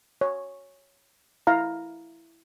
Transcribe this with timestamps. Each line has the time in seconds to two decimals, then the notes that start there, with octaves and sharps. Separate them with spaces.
0.21 C#5
1.47 E4 F5 A#5